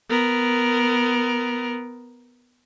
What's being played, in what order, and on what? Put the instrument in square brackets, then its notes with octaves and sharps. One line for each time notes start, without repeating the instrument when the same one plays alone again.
[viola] B3 A#4